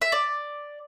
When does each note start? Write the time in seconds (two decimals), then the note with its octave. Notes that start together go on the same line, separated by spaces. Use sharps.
0.02 E5
0.12 D5